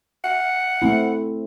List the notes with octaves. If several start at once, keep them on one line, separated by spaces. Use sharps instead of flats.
F#5
A3 C4 E4